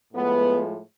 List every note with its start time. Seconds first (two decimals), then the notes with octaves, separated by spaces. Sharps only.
0.13 A2 F3 G#3 B3